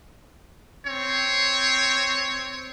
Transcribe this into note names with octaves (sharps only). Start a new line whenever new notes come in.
C4 C#5